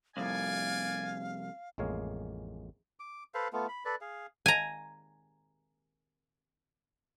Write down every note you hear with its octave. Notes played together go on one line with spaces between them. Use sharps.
C2 F2 D5 F5 G#5
A1 F2 G#3 A#3 C#5 F5
D6
A4 B4 C5 F5
A3 B3 F4
B5
A4 B4 D5
G#4 F5
G#5 A#5